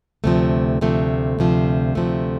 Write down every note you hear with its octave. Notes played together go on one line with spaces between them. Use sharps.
D2 C3 F3 A3
D2 C3 F3 A3
D2 C3 F3
D2 C3 F3 A3